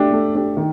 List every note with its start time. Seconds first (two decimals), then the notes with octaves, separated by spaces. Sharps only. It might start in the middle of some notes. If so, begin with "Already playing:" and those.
Already playing: A3 D4 G4
0.12 A3
0.35 D4 G4
0.57 D#3